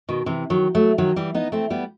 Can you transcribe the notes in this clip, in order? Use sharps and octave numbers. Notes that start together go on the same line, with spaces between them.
B2 D#3
C3 E3
D#3 F#3
F#3 A3
D#3 F#3
E3 G3
B3 D#4
A3 C4
G3 B3